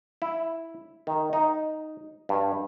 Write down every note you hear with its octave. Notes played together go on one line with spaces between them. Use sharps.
E4
D#3
D#4
G2